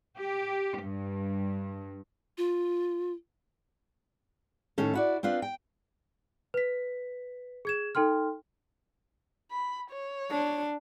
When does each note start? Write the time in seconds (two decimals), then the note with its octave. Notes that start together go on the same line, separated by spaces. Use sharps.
0.18 G4
0.83 G2
2.38 F4
4.78 A2 D#3 C#4 A4
4.94 E4 F#4 D5
5.23 C4 D4 F4 B4
5.42 G5
6.54 B4 B6
7.65 G#4 G#6 E7
7.95 D#4 A4 G5 C6 F6
9.51 B5
9.91 C#5
10.30 D4